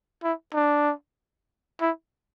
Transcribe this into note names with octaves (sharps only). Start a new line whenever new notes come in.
E4
D4
E4